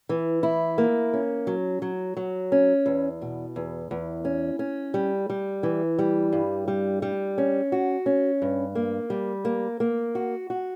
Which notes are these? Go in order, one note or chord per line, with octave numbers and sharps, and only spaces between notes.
E3
E4
A#3
C#4
F#3
F#3
F#3
C#4
E2
B2
E2
E2
C#4
C#4
G3
G3
E3
G3
G2
G3
G3
C#4
F#4
C#4
G2
A#3
G3
A#3
A#3
F#4
F#4